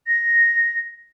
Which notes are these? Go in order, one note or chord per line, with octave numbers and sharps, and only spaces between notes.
A#6